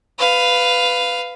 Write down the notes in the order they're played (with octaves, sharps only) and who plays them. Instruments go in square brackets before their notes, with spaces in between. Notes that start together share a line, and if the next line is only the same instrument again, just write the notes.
[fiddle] B4 F5